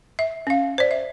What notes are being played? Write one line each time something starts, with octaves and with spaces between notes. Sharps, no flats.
E5
C#4 F5
C5 D5
E5